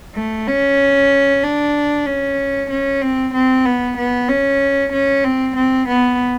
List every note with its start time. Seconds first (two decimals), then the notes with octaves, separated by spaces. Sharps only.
0.16 A3
0.47 C#4
1.43 D4
2.06 C#4
2.70 C#4
3.02 C4
3.34 C4
3.65 B3
3.97 B3
4.29 C#4
4.92 C#4
5.24 C4
5.56 C4
5.88 B3